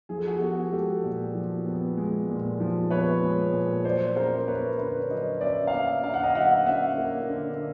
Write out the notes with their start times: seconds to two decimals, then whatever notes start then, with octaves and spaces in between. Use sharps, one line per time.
0.09 F3 G#4
0.18 A4
0.27 F#4 G#4
0.36 G4
0.41 B3 F#4 G#4
0.72 G#3 G4 A4
1.03 A#2
1.35 F3
1.66 B3
1.97 G#3
2.29 A#2
2.60 F3
2.90 B3 B4 C#5
3.22 G#3
3.53 A#2
3.85 F#3 C5 D5
4.16 C#4 A#4 C5
4.47 A#3 B4 C#5
4.78 D3 B4 C#5
5.10 F#3 C#5 D#5
5.41 C#4 D5 E5
5.67 F5
5.72 A#3 D5 E5
6.04 D3 F5
6.14 F#5
6.23 D#5 F5
6.35 F#3 E5 F#5
6.66 C#4 E5 F#5
6.98 A#3
7.29 D3